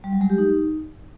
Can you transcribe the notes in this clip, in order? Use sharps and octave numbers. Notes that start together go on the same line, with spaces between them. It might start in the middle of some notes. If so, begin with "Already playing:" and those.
G3
F#3
G#3
G4
D#4